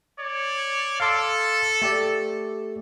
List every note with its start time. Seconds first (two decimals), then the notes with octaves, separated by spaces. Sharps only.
0.16 C#5 D5
1.00 A4 F5 C6 D6
1.82 A3 G4 D5